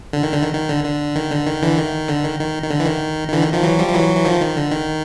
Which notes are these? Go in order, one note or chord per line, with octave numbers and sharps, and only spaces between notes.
D3
D#3
D3
D#3
D#3
D3
D3
D#3
D3
D#3
D3 E3
D#3
D3
D#3
D#3
D#3
D3
E3
D#3
D#3
D3 E3
D#3
D#3 F3
E3 F#3
F3 G3
F3
E3 F#3
E3
D#3 F3
D#3
D3
D#3